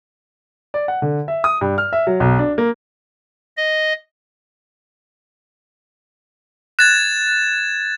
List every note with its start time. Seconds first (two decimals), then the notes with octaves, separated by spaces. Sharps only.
0.74 D5
0.88 F#5
1.02 D3
1.28 E5
1.44 D#6
1.61 G2
1.78 F6
1.93 E5
2.07 F#3
2.20 B1
2.39 D4
2.58 A#3
3.57 D#5
6.79 F#6 G#6 A6 E7